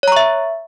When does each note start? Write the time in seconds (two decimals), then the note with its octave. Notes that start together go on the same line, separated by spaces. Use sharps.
0.03 C#5
0.08 A#5
0.12 C#6
0.16 E5